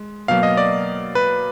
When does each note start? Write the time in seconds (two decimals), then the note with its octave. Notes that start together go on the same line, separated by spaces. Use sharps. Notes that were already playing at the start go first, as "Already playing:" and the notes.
Already playing: G#3
0.28 B2 F#3 A#3 F5
0.43 D#5
0.57 D5
1.15 B4